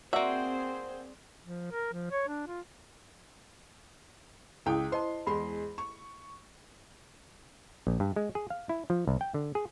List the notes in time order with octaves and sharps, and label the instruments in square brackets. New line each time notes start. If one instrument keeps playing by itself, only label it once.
[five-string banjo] A#3 E5 [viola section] C4 G#4 C5 [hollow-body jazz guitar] F#4 [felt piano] D5
[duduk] F3
A#4
F3
C#5
D4
F4
[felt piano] C#2 G5 [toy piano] E4 G#4 D#6
[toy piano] C5 D#5 A5 [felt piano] C6
[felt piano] E2 G#3 C6 [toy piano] B5
[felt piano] C#6
[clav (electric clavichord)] A#1
G2
G#3
G#4
F5
E4
F3
C2
G5
D3
G#4